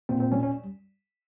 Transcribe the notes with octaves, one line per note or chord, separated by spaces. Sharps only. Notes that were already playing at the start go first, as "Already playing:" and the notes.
A#2 C4
C4
G3 C#4
C#4